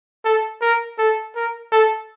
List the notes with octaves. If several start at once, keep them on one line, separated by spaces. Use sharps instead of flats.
A4
A#4
A4
A#4
A4